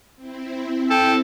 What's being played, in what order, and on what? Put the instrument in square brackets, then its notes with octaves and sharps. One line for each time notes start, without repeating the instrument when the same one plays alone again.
[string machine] C4 E4
[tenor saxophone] A4 [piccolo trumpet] G5